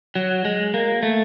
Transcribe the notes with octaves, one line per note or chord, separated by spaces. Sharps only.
F#3
G#3
A#3
A3